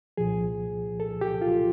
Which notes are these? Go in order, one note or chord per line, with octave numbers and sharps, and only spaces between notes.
C2 A#2 F3 G#4
A4
G4
F4